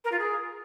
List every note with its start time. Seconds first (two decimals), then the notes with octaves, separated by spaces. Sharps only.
0.04 A#4
0.11 F4
0.19 G#4